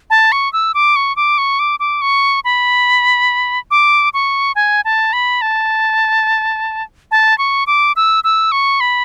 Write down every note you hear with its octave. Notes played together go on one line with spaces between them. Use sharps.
A5
C#6
E6
D6
C#6
D6
C#6
D6
D6
C#6
B5
D6
C#6
G#5
A5
B5
A5
A5
C#6
D6
E6
E6
C#6
B5